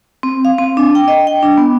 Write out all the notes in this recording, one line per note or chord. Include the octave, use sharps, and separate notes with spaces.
C4
F5
C4
D4
G5
D#5
G5
D4
B3